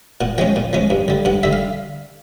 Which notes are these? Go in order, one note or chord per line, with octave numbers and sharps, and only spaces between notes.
A#2 F#5
F3 G#3 C#4 G5
A#2
F3 G#3 C#4
G2
D3 G3
G2 F#5
D3 G3 E5
F5